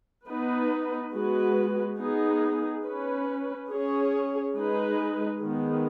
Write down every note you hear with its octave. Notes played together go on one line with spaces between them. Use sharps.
B3 D#4 B4
G#3 B3 F#4 B4
B3 D#4 G#4
C#4 B4
C#4 G#4 C#5
G#3 D#4 G#4 B4
D#3 G#3 B3